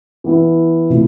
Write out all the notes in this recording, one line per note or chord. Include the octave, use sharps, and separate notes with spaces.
E3 B3 E4
C3 F3 A3 E4